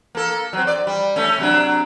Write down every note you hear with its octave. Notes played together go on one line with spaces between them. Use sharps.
A#3 A4
F#3 C4
D5
G3
A3 C#4
C3 F#3 D4